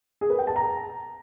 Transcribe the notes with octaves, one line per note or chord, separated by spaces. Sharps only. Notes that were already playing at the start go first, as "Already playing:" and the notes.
G#4
B4
G5
A5
A#5